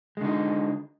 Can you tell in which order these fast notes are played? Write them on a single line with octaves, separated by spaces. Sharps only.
G#3 D3 D#4